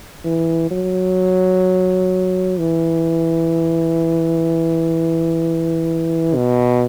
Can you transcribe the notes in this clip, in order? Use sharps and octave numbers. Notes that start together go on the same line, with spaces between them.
E3
F#3
E3
B2